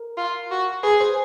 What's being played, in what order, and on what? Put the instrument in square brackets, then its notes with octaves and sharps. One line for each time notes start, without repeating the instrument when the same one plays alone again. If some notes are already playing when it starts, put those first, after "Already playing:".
Already playing: [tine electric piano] A#4
[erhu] F4
F#4
[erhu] G#4 [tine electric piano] B4
[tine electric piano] C5